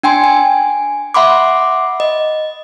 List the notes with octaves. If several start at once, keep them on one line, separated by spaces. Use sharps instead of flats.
D4 G5 G#5 C6
G#5
E5 F#5 B5 C6 D6
D#5